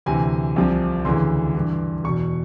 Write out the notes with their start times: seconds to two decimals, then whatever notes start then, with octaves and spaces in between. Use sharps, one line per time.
0.06 D2 C3 E3 G#5
0.56 C2 C3 F3
1.05 D2 C#3 E3 C6
1.54 G2 E3
2.04 E2 B2 C#6